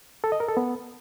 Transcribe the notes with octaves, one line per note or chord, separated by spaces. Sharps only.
A4
D#5
A#4
A4
B3